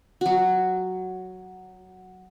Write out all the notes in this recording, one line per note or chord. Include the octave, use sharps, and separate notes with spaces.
F#3 F#4